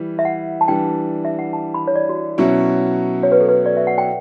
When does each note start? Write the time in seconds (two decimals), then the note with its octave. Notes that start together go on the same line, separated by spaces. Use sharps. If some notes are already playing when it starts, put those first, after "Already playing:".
Already playing: E3 G3
0.19 E5
0.25 F#5
0.61 A5
0.68 E3 G3 D4 G5
1.25 E5
1.39 F#5
1.53 A5
1.74 B5
1.87 C#5
1.96 D5
2.09 F#4
2.38 B2 F#3 C#4 E4
3.23 C#5
3.32 B4
3.41 A4
3.49 B4
3.66 D5
3.77 E5
3.87 F#5
3.98 G5